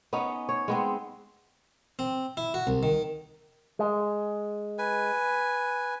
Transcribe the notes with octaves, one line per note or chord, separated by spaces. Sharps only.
B3 C#4 D#4
C#5
G#3 B3 C4
C4
E4
F#4
C2
D#3
G#3
B4 G#5